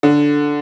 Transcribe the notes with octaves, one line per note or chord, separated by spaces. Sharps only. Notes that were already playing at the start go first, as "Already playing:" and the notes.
D3